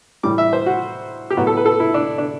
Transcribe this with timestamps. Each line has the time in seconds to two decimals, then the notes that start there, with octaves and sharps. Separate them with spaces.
0.23 A2 E3 G3 D6
0.38 E5
0.53 C5
0.66 F#4
1.30 G4
1.37 A2 F#3 B3 F#4
1.47 A4
1.57 B4
1.66 A4
1.80 E4
1.94 D4
2.18 D4